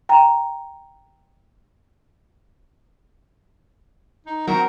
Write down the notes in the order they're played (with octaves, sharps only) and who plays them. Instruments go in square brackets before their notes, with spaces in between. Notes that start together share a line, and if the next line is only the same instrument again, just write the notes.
[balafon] G5 A#5
[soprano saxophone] D#4
[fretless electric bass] F#3 [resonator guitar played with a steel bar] C4 F#4 [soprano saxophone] A#4